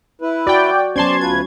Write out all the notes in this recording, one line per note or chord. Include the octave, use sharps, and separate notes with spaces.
E4 B4
F#4 D5 G5
F#3 B3 C#4 C5 D5 A5 C6 G#6
D2 F4 B4 G#6